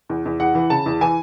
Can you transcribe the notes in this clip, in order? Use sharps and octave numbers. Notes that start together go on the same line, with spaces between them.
E2
E2
E2 F#5
E3
C#3 A5
E2
E3 G#5